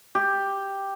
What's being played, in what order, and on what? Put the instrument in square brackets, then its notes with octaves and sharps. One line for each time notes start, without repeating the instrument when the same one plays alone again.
[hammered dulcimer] G4